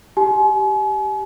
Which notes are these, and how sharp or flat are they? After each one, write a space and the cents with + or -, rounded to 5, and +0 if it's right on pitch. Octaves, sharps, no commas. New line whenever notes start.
G4 -5 G#5 +40